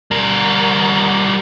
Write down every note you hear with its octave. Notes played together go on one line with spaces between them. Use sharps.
G3 A#4